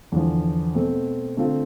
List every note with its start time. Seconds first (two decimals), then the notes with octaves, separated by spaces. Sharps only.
0.12 E2 D3 F3
0.75 B2 A3 C4
1.37 D3 A3 C4 F4